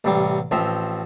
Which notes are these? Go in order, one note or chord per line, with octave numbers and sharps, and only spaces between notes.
A1 C3 G3 D6
A1 F3 C4 E5